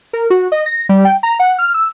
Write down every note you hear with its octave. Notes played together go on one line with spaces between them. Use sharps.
A#4
F#4
D#5
A#6
G3
G5
A#5
F#5
F6
E6